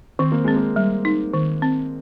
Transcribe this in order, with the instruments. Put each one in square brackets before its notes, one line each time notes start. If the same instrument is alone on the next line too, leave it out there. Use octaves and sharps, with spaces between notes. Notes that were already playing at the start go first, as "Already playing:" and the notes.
[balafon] D#3 [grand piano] C4
[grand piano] A#3
[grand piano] G#3 [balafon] C4
[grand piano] A#3
[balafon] G3
D#4
D#3
C4